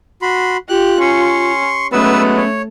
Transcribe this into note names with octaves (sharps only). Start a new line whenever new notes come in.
F#4 B5 C6
F4 G4 F#6
C#4 C6 C#6
F#3 G#3 A3 B3 C#4 B4 E6
C#5